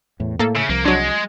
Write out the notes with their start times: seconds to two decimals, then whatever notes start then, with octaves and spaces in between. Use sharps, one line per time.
0.20 E2 A2
0.39 A2 A#3 A4
0.55 C#3 E5
0.69 C2 F3 A#3
0.85 F#3 G#3 D4